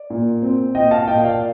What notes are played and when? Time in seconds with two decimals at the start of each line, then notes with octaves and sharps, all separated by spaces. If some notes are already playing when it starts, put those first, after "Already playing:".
Already playing: D5
0.10 A#2
0.42 C4
0.75 A#2 D#5 G5
0.91 F5 A5
1.07 A#2 D#5 G5
1.24 D5 F5